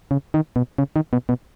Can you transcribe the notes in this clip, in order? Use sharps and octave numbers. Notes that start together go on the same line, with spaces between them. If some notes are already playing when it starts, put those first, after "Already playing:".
C#3
D#3
B2
C#3
D#3
B2
B2